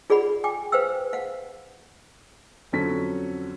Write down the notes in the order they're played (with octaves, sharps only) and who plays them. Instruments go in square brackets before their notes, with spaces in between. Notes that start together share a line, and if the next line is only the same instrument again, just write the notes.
[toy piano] F4 G#4 D5 F#5 B5
G5 G#5 D6
B4 C5 F5 G5 E6
F5 F#5
[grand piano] F2 D3 F#3 C#4 A4 B6